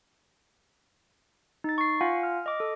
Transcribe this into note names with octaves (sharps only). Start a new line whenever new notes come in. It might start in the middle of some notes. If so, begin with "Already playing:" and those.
D#4 A6
C#6 C7
F4 F5 F#5 G#5
F6
D#5 D6
A4